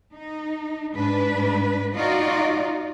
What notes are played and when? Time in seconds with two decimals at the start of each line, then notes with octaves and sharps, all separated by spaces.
0.13 D#4
0.95 G#2 D4 B4
1.95 D#4 F4 F#4 D5 D#5